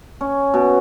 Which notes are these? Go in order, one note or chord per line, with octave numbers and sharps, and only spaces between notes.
C#4
B2